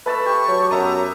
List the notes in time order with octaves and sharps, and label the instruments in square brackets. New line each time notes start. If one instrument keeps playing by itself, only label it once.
[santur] A3 A5 E6 [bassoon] B4
[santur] G4 [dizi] C#6
[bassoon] F#3
[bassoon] F#2 [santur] B3 E5 D#6 [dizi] A#5